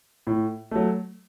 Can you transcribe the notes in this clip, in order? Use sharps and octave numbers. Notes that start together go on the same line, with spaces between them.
A2
F#3 A3